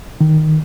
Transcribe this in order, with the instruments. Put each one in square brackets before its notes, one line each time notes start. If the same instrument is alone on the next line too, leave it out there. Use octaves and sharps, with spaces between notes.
[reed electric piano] D#3